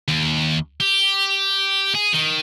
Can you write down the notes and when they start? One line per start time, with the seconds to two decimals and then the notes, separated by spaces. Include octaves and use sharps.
0.08 D#2
0.80 G4
1.95 G#4
2.13 D#3